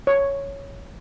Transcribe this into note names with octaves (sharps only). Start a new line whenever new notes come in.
C#5